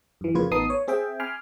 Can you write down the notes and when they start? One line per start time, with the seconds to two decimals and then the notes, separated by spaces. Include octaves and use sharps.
0.21 F#2 E3
0.34 F2 A#2 C#3 F4 B4 G#6
0.51 A1 B3 D#4 A5 D#6 C7
0.70 C#5
0.88 C4 G#4 E5 G5
1.20 G#5 B5 C6 D6 F6